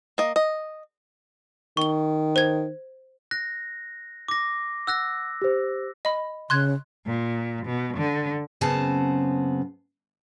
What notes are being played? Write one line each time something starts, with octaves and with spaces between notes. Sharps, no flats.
A#3 D#5
D#5
D#3 C#6 G7
C5 G#6
F#6 A#6
D6 A#6
F#5 E6 F#6 A#6
G4 C5
D#5 B5
C#3 C6 F#6 G#6
A#2
B2
D3
F#2 C#3 B3 C4 A5